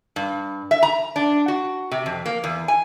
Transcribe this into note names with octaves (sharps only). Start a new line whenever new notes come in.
G2
E5
A#5
D4
F#4
C3
F2
A#3
E2
G#5